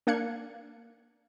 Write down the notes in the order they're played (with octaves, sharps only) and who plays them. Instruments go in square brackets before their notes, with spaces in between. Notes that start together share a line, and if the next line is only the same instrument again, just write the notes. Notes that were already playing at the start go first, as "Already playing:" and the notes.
[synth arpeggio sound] A#3 D4 F5 F#6 G#6 C#7